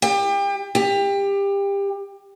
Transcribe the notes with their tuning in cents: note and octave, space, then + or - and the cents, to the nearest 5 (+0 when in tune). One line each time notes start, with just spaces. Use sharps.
G4 +30
G4 +25